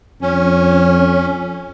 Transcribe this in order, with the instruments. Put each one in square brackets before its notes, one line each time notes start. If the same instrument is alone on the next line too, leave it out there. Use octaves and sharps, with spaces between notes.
[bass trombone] F2 [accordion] C#4